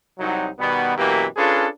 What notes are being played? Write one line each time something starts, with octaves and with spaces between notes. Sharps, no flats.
C2 F#3 D#4
B2 D#3 G3 B3
F#2 B2 E3 A#3 G4
C#4 D4 F4 G#4 A4 B4